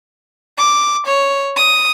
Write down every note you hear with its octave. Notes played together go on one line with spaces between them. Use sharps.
D6
C#5
D#6